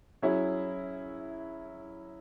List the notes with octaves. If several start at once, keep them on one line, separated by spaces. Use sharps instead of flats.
F#3 C#4 E4 G#4